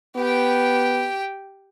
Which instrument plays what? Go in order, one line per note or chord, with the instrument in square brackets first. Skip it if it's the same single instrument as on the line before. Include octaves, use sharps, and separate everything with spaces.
[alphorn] B3 [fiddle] G4 G5